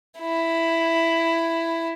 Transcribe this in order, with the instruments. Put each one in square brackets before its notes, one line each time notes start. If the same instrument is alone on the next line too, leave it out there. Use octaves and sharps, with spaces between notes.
[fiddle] E4